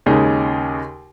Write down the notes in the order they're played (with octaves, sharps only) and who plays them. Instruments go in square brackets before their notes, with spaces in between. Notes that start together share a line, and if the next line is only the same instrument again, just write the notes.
[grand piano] D#2 C#3 G#3 D#4 G#4